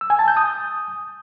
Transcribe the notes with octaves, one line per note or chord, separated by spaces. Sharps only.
E6
G#5
A5
G6
D#6